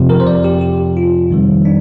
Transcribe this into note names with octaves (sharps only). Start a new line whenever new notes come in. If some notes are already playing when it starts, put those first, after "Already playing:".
Already playing: F2 C3 F3
A#4
C5
D5
G4
G4
F4
F2 D#3 G3
D4